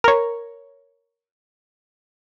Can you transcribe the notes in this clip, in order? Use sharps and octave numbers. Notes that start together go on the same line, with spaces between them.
A#4 C#5